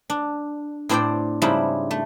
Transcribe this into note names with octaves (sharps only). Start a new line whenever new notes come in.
D4
A2 C4 D4 C5 D5 G5
G#2 C#3 G3 C4 D4 E4
A3